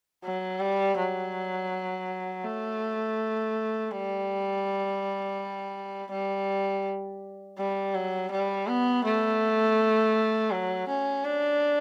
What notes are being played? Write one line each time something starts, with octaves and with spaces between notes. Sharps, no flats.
F#3
G3
F#3
A3
G3
G3
G3
F#3
G3
B3
A3
F#3
C#4
D4